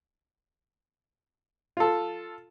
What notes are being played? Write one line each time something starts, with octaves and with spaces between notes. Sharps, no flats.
F4 A4